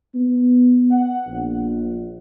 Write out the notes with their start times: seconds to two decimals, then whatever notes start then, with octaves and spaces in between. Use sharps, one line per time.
0.15 B3
0.91 F#5
1.27 A#1